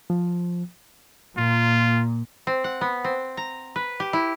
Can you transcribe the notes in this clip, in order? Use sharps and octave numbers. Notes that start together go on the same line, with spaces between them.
F3
A#2 F4
C4
F#5
B3
C4
A#5
B4
G4
E4